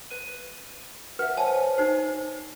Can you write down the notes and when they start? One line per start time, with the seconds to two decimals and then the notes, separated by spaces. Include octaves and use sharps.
0.10 B4 D#7
1.19 B4 E5 F#5
1.37 C5 C#5 G#5 A5
1.78 D#4 C5 C7